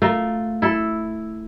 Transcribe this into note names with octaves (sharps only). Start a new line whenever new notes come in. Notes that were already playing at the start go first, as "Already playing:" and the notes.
A3 F4 A#4
E4 A4